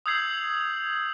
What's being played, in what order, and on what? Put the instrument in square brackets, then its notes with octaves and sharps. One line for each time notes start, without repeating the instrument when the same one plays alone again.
[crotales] D#6 E6 G6 G#6 C7 F#7